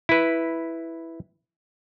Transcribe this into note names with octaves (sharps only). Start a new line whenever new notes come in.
E4 B4